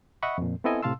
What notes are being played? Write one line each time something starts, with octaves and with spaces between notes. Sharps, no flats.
D#5 E5 F#5 B5 C#6
F2 A#2
B3 C4 E4 A4 D#5 G#5
A2 C3 F5 A5 C6 E6